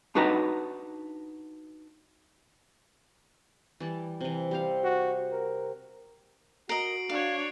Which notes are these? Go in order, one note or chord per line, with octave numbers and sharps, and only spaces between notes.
D4 D#4 F#4 B4 D#5 A#5
E3 G3 A5
C3 E3
G3 C4 F5
F#4
A#4
F#4 A#4 D#5 C7 D7 F#7
D4 C#5 F5